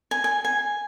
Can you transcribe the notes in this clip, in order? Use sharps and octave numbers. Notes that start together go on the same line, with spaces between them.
G#5
G#5
G#5